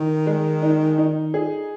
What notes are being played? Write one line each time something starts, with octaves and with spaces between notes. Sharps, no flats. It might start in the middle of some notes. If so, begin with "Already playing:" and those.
Already playing: D#3 D#4
G#3
D#4
D#4
G#4